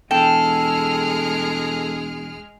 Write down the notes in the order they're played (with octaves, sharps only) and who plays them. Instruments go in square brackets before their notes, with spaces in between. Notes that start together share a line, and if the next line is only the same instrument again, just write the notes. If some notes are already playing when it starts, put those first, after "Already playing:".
[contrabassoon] E1 [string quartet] G#3 G#4 F6 [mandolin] A4 [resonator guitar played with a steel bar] G5